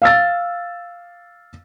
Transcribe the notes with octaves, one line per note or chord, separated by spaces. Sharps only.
F5 E6 A6